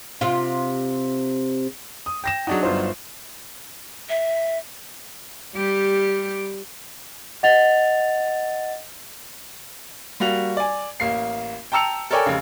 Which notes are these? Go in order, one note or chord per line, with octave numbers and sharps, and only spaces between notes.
C3 F4
D#6
G5 A#6 E7
F#3 D4 D#4 F#4 G#4
G1 F4 C5
E5
G3 G4
D#5 F#5 A6 F7
G3 A#3 F#4 F7
D5 G#5
A1 A#3 C7
G5 A5 A#5 E6 C#7 F7
A4 A#4 C#5 D5 G5 G#5
F1 C#3